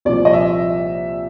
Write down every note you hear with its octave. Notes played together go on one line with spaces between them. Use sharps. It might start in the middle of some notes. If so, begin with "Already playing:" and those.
C2 A#2 F3 D5
D#5
E5